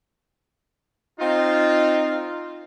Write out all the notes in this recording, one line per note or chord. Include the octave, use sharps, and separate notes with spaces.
C4 D#4 F4